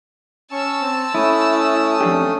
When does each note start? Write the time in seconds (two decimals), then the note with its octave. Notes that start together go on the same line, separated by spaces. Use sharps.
0.52 C#4 A5 C#6 E6
0.82 C4
1.15 A3 C#4 E4 D#6
2.01 F2 D4 G4